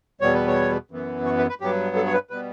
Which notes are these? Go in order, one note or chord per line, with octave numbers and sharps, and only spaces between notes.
E2 B2 G3 B3 C#5
B4
C#5
F#2 E3 B3
C#5
B4
B4
G2 F#3 B3 G4
A4
C#5
B4
B2 G3 B3 B4